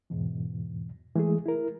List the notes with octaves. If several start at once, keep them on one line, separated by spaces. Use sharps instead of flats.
E2 G#2 B2 E3
E3 G#3 A3 G#4
E4 A#4